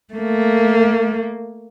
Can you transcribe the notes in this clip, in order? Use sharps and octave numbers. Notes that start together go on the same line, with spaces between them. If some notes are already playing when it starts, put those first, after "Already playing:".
A3 A#3